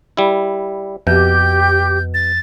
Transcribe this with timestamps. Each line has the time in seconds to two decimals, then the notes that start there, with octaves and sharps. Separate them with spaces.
0.17 G3 E4
1.07 F2 B2 G4 G6
2.14 A6